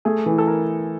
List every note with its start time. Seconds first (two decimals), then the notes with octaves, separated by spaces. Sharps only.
0.05 A3 G#4
0.26 E3
0.38 A4
0.47 A#4